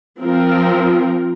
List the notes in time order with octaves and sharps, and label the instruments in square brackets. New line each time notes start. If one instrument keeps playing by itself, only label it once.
[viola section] F3 C4 F4 A#4